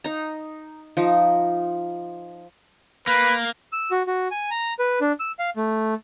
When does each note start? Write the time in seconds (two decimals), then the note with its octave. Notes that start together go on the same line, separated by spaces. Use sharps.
0.04 D#4 A#5
0.97 F3 D#4
3.07 A#3 B4
3.73 E6
3.91 F#4
4.07 F#4
4.31 G#5
4.51 A#5
4.79 B4
5.01 D4
5.20 E6
5.39 F5
5.56 A3